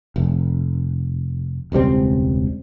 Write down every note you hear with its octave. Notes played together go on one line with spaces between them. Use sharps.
F1
E1 C#2 G3 C4